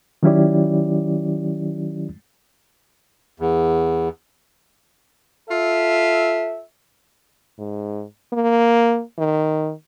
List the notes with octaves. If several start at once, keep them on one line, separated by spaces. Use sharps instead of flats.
D#3 F#3 C#4 E4 G4 D5
E2
F4 A4 E5
G#2
A#3
D#3